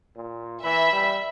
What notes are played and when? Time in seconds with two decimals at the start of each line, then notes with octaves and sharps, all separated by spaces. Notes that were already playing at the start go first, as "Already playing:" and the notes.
0.16 A#2
0.64 E3 E5 B5
0.93 G3